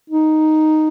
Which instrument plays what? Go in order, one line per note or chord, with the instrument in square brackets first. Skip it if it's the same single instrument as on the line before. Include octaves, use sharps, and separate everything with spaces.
[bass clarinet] D#4